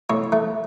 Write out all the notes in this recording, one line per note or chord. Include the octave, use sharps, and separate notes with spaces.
A2 C#5
A3